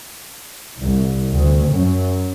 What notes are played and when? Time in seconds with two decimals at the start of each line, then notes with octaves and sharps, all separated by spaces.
0.80 C2
1.31 D2
1.66 F#2